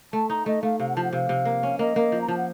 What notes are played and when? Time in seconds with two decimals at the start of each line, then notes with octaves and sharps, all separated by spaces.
0.13 A3 A5
0.30 D#4 A#5
0.46 A3 D#5
0.63 A3 F5
0.80 C3 F5
0.88 F#5
0.96 F3 A5
1.04 F#5
1.13 C3 F5
1.29 C3
1.45 A#3
1.63 C#4
1.79 A#3 D#5
1.96 A#3
2.12 F3
2.21 A#5
2.28 F3 A5
2.37 F#5